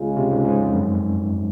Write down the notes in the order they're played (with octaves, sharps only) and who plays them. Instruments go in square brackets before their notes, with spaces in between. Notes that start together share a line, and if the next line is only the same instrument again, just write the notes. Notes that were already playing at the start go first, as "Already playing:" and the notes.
Already playing: [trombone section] C#2 C#3 G#3 C#4 F4
[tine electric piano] C3
G#2
G#2
F2
F#2